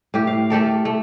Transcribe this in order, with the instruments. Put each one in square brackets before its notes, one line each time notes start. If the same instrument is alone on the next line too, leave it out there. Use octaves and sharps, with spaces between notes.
[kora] A2 G4
F5
A3 G4 A4 A#4
A3